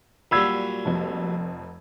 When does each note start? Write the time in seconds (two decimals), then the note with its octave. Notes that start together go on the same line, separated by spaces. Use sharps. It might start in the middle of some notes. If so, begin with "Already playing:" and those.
0.31 A#2 F#3 G3 B5 E6 G#6
0.85 F1 F2